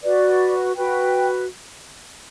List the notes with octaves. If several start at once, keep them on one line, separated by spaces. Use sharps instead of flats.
F#4 B4 D5
F#4 B4 G5